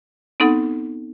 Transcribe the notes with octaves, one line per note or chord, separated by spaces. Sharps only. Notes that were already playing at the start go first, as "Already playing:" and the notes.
B3 C4 D#4 A4 F#5